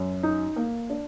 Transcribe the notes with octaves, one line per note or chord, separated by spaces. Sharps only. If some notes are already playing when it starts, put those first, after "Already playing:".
Already playing: F#2
D#4
A#3
D4